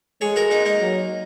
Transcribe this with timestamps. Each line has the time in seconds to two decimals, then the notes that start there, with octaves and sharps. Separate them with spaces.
0.21 G#3 G#4 C#5
0.36 F#4 A#4
0.51 A#3 D#4
0.65 A#3 D#4
0.80 F#3